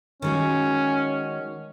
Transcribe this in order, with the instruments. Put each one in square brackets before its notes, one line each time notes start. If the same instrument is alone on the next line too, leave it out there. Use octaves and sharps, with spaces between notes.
[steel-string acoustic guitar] D#3 G#3 F#4 [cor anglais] C#4